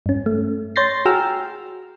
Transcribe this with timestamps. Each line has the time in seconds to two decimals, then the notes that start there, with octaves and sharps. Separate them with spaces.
0.06 G2 C#4
0.26 A3
0.76 C#5 C6 G6 A6 A#6 C7
1.05 F#4 G#4 G5 A#5 E6 F6